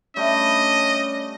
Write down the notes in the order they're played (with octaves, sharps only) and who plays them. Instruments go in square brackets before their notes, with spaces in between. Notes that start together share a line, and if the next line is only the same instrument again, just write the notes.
[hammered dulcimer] G3 A3 D4 [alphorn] C#4 [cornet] D#5